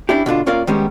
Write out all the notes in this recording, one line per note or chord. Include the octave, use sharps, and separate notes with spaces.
C#4 D4 E4 G4
B2 D3 D4 F4
A#2 C#4 F4 A#4 D5 F5
D#3 G3 G#3 B3 C#4 G4